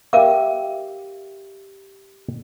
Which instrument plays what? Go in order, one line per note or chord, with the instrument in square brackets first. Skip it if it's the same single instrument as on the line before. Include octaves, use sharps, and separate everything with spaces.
[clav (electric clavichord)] G4 E5 [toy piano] A#4 F5 D6